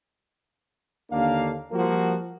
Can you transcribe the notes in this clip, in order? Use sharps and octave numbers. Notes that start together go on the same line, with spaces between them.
D#2 D3 A#3 D4 F5
F3 G3 A#3 F4 F#4 A#4